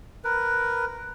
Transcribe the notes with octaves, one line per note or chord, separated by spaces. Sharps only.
A#4 B4